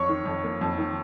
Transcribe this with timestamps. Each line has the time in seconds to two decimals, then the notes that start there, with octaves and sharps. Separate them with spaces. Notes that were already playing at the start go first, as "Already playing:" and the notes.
Already playing: F2 C#5 C#6
0.09 D#3
0.26 F2
0.44 A#3
0.61 F2
0.78 D#3